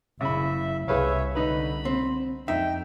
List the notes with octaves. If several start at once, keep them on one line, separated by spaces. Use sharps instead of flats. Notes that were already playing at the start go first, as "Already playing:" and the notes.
F#1 C#3 E4 E5 B5
C2 G#4 B4 C#5 E5 F5
C2 D3 D#4 B4 B5
C4
F2 D#4 E5 G5